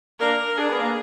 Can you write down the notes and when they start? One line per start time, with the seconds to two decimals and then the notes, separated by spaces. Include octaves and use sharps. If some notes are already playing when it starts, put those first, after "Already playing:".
0.20 A#3 D4 A#4
0.57 D4 G#4
0.69 B3
0.79 A#3